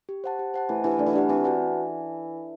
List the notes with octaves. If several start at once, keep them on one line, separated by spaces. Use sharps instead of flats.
G4
C5 F#5 A5
G4
C5 F#5 A5
E3 A3
E3 D4 G4 B4 F#5
D3 A3
E3
D3 D4 G4 B4 F#5
E3 C4
F#4 B4 F#5 A5